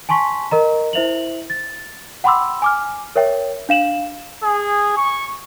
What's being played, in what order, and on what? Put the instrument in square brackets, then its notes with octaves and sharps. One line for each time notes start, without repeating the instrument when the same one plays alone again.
[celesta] G#5 A5 C6 C#6 B6
A#4 D#5 A#5
E4 C5 E5 F7 F#7
A6
F#5 G5 B5 C6 D6 E6
G#5 D6 F6
A#4 C#5 E5 G5
D4 F5 E7 F#7
[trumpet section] G#4
C#6